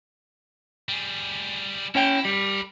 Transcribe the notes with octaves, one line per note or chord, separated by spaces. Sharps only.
G3 G#4
C#4 E4 C#5 G5
G3 A#4 B5